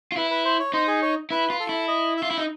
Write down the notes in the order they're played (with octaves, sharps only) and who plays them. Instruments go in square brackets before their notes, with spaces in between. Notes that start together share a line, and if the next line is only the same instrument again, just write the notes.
[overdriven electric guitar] F4
[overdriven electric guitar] E4 [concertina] B4
[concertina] B4
C5
C#5
[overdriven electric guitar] D#4 [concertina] C5
[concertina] G#4
C#5
[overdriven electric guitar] E4 [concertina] B4
[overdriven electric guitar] F4
[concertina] A4
[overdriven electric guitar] E4
[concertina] D#5
E5
[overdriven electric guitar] F4
E4
D#4